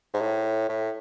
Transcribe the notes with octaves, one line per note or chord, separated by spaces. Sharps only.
G#2
A2
A2